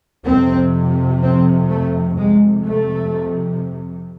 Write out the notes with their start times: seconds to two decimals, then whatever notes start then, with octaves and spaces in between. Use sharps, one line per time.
0.25 F2 C3 C4
1.21 C4
1.69 A3
2.16 F2 C3 G#3
2.64 A3